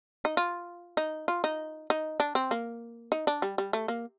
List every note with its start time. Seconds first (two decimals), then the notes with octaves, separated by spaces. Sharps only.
0.25 D#4
0.37 F4
0.97 D#4
1.28 F4
1.44 D#4
1.90 D#4
2.20 D4
2.35 C4
2.51 A#3
3.12 D#4
3.27 D4
3.42 G3
3.58 G3
3.73 A3
3.88 A#3